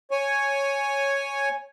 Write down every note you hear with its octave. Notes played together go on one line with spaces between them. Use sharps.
C#5 G#5